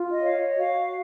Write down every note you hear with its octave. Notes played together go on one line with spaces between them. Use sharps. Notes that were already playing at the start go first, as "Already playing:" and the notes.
Already playing: F4
D#5
C#5 F5
D#5
D#5
F#4 F5